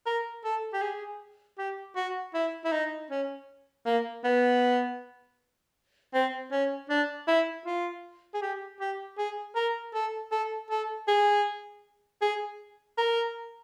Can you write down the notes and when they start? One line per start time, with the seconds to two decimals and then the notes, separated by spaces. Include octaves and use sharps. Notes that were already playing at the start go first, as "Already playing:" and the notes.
0.06 A#4
0.44 A4
0.73 G4
0.82 G#4
1.58 G4
1.96 F#4
2.34 E4
2.64 E4
2.72 D#4
3.10 C#4
3.86 A#3
4.24 B3
6.14 C4
6.52 C#4
6.90 D4
7.28 E4
7.66 F4
8.34 G#4
8.42 G4
8.80 G4
9.18 G#4
9.55 A#4
9.94 A4
10.32 A4
10.70 A4
11.08 G#4
12.22 G#4
12.98 A#4